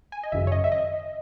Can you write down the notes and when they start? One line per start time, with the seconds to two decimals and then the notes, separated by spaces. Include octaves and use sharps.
0.12 G#5
0.23 D#5
0.32 G#1 F#2 C#3 E5
0.47 C#5
0.52 D#5
0.64 E5
0.72 D#5